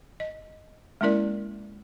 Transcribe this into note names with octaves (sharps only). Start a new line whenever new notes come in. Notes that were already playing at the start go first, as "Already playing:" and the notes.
D#5
G#3 A#3 C#4 E4 A#4 D5